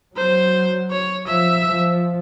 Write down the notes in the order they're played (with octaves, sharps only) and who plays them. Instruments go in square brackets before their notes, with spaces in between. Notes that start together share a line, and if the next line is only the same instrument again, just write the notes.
[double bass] F#3 [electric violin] C5
[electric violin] C#5
[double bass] F3 [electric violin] E5
[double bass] F3